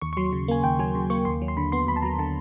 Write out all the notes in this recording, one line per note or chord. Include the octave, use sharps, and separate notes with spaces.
D#2 C#6
C#6
F#3 C6
C#3
A#3 G#5
D#2 G5
F#3 G#5
C#3
A#3 C#6
D#2 C6
F#3
C6
D3 B5
B3 C6
D#2 B5
A5
F#3 A#5
D3 A5